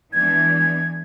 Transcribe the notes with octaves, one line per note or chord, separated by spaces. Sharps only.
E3 G#3 B3 D4 G#6